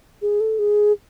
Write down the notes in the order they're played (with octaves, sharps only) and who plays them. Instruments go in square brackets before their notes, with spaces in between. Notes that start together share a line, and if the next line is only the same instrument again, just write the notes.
[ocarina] G#4
A4
G#4